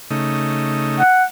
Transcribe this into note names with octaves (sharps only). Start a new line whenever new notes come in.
C#3 A3 D#4
F#5